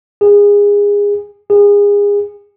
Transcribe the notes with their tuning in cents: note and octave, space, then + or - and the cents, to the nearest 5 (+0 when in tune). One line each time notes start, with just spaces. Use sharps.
G#4 -25
G#4 -30